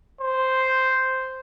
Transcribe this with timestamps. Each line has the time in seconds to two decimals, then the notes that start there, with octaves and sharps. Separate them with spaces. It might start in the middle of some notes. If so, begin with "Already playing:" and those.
0.21 C5